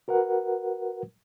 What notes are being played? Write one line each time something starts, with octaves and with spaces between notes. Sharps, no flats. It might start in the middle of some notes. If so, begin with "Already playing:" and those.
F#4 A#4 B4 F#5